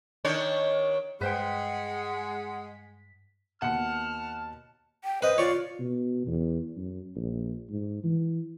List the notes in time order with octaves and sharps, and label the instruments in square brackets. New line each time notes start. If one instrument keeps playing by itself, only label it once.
[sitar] D#3 D4 C#5
[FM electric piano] G2 B6 [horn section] G#3 [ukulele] B4 C5 G5 [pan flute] F#5
[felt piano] D#2 B2 C#7 [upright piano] F#5 [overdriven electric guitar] A5 [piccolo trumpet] F6
[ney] G5
[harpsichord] B4 D#5 [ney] C5
[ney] F4 [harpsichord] C#5 D5
[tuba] B2
E2
F#2
A#1
G#2
E3